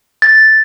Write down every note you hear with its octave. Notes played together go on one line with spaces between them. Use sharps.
A6